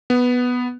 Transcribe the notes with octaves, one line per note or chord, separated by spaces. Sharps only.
B3